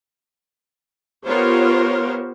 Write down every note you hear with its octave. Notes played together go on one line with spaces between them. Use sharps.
B3 F4 G4 A#4 C5 C#5